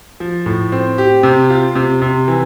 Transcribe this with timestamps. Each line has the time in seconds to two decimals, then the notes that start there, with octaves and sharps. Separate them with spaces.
0.20 F3
0.46 A2
0.72 C4
0.98 G4
1.23 C3
1.50 F4
1.75 C3
2.02 C3
2.28 E3